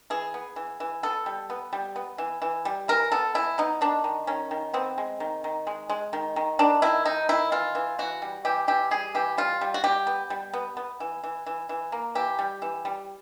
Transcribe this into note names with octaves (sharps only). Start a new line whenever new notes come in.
E3 G#4
B3
E3
E3
B3 A4
G3
B3
G3
B3
E3
E3
G3
E3 A#4
B3 A4
E3 E4
B3 D#4
D#3 D4
D#3
D#3 C#4
D#3
B3 C4
G#3
D#3
D#3
G#3
G#3
D#3
D#3
D#3 D4
D#3 E4
D#3 D#4
D#3 E4
E3 F4
E3
E3 F#4
G3
E3 G4
E3 G4
G3 G#4
E3 G4
G3 F4
G3
F#4
G3 G4
B3
G3
B3
B3
E3
E3
E3
E3
A#3
E3 G4
G3
E3
G3